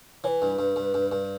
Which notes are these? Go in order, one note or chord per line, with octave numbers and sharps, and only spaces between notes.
E3 B4 C#5
G2
G2
G2
G2
G2